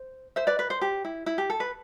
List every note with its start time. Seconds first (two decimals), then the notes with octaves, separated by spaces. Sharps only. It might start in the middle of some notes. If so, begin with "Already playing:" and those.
Already playing: C5
0.36 C5 E5
0.47 B4 D5
0.59 B4
0.70 C5
0.81 G4
1.05 E4
1.26 E4
1.38 G4
1.50 A4
1.60 B4